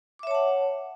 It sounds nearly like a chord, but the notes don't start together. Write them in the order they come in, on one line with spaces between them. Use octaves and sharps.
D6 E5 C#5 A5 F#5